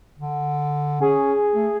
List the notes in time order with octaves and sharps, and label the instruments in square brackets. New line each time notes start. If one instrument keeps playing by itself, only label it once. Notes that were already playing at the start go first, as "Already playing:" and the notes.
[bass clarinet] D3
[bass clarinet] C#4 [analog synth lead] G#4
[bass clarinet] A3